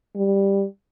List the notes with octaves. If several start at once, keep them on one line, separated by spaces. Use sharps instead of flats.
G3